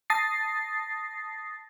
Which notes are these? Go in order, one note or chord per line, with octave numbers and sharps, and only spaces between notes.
A5 D#6 A6 A#6 C7